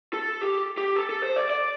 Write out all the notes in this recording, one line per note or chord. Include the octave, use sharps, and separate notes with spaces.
A4
G4
G4
A4
A4
C5
D5
D5